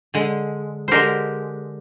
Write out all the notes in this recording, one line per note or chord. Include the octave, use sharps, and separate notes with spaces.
D3 G#3
D3 G#3 G4 A#4 C5